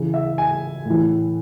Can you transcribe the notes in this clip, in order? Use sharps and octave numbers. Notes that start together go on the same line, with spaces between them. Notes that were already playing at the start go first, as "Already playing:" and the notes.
Already playing: C#3 E3
E5
G#5
A2
E3